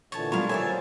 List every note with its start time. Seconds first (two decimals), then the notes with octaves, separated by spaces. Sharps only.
0.12 A#2 D3 E3 C#5 A5
0.32 B2 F3 G3 C#5 F5 A#5 C6 F7
0.49 A#2 A4 A#4 C#5 D5 E5 G#5
0.61 F#3 F4 C5 A6